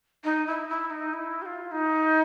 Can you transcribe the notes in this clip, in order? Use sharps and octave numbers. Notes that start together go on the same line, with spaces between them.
D#4
E4
E4
D#4
E4
G4
F4
D#4